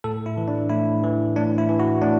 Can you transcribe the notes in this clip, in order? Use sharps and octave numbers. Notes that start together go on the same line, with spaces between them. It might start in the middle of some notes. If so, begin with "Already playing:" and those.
A2 A4
E4
E3
D4
A2 E4
E3
A2 D4
E4
E3
F#4
A2 D4